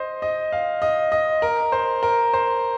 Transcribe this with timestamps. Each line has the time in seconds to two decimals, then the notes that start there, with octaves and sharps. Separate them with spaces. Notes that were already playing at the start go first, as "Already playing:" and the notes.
Already playing: C5 D#5
0.22 D#5
0.52 F5
0.82 D#5
1.12 D#5
1.42 A#4
1.72 C5
2.03 A#4
2.34 C5